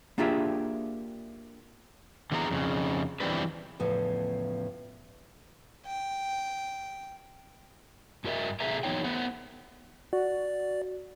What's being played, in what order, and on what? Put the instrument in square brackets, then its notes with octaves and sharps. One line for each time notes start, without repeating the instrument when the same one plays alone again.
[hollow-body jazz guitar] A#3 D4 F4 G4 G#4 E5
[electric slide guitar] D3 E3 B3 G#4 G#5 A#5
F2 C#3
E2 E3 G3 C4 D4 B4
[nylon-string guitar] E2 A2 C#3 F3
[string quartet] G5
[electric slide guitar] G2 F#4 A#4 D#5 E5
B2 G#4 A4 B4 E5 A#5
E3 F#3 B3 D#4 C#5 G5
A3 B3 C5 F#5
[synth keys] F#4 [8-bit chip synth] D5